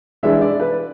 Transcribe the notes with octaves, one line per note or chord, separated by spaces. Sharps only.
E3 G#3 D4 E5
D5
B4